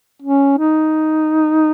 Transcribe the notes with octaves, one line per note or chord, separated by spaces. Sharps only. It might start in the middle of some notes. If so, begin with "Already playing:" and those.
C#4
D#4